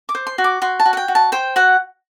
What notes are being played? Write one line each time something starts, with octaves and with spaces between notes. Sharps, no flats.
D6
C5
C6
F#4
D6
F#4 C6
A5
F#4
F#5
G5
F#4
A5
C5 G5
F#4 F#5